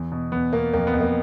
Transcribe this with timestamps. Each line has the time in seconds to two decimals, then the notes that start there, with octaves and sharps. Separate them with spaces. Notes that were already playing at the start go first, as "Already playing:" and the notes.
Already playing: E2
0.12 B2
0.32 E2 B3
0.53 B2 A#3
0.73 F2 A#3
0.87 B3
0.94 F2
1.01 A#3